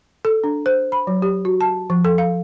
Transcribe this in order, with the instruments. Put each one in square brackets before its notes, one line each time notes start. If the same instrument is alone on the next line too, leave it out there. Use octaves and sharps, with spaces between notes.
[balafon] A4
D4
C5
B5
F#3
G4
F#4
A5
F3
A4
F5